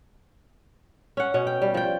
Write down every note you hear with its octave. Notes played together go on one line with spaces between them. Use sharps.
C#4 F#5
B2 C#4
G5
G3
F3 G5